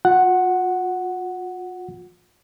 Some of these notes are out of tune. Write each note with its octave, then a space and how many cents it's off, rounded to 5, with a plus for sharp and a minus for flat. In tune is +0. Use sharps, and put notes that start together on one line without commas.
F4 +45 F#5 +0